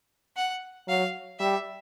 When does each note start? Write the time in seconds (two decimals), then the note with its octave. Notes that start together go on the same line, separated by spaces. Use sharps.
0.37 F#5
0.88 F#3 F5
1.40 G3 E5